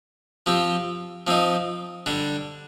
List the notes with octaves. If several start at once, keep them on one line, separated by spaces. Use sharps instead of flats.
F3 C4 G4
F3 C4 D#4
D3 G3 D4